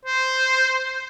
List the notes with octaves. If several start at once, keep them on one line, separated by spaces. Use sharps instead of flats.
C5